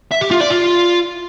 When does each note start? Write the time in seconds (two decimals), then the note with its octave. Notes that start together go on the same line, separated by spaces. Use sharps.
0.12 E5
0.21 G4
0.31 F4
0.41 D5
0.50 F4